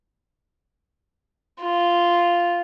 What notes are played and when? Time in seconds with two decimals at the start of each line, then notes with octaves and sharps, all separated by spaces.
1.61 F4